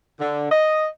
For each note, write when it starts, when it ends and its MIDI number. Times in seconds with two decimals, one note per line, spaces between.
0.20 0.50 50
0.51 0.87 75